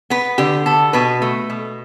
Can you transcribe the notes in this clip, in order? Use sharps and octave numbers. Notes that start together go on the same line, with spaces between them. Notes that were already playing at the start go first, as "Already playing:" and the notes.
B3 B4
D3 G4
B3 A4
B2 B4
A3
B2